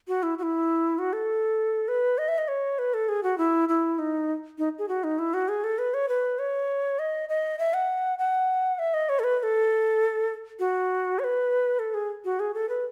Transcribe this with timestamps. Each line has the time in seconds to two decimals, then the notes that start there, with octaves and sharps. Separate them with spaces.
0.08 F#4
0.23 E4
0.38 F#4
0.43 E4
0.99 F#4
1.13 A4
1.88 B4
2.18 D#5
2.28 E5
2.38 D#5
2.48 C#5
2.79 B4
2.94 A4
3.09 G#4
3.23 F#4
3.38 E4
3.69 E4
3.99 D#4
4.59 D#4
4.79 G#4
4.89 F#4
5.04 D#4
5.19 E4
5.34 F#4
5.48 G#4
5.64 A4
5.78 B4
5.94 C#5
6.09 B4
6.39 C#5
6.99 D#5
7.29 D#5
7.59 E5
7.74 F#5
8.19 F#5
8.79 E5
8.94 D#5
9.09 C#5
9.19 A4
9.24 B4
9.40 B4
9.43 A4
10.59 F#4
11.19 C#5
11.24 B4
11.79 A4
11.94 G#4
12.25 F#4
12.40 G#4
12.54 A4
12.69 B4